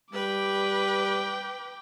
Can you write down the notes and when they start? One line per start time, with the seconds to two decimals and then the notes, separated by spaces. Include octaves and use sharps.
0.13 G3 B4 G5 D6